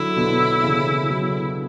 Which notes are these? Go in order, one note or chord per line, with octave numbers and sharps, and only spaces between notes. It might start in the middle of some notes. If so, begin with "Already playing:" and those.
Already playing: D3 F#3 E4
B2 D3
C#3 E3
D3 F#3